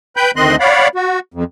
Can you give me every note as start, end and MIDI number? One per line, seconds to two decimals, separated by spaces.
0.17 0.31 71
0.17 0.31 79
0.17 0.31 83
0.17 0.31 91
0.36 0.56 38
0.36 0.56 51
0.36 0.56 60
0.36 0.56 75
0.36 0.56 84
0.36 0.56 90
0.60 0.88 73
0.60 0.88 74
0.60 0.88 77
0.60 0.88 78
0.60 0.88 83
0.95 1.19 66
1.34 1.44 41